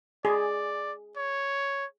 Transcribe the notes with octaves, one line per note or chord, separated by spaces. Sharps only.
G#4 D5
C#5